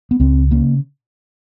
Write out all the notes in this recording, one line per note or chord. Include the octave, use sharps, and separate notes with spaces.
B3
C#2 C4
C#3 A#3